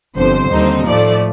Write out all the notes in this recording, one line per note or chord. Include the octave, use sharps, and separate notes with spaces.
G1 F2 D3 C5
D#2 D3 G3 C4 D#4
A2 F3 A3 D5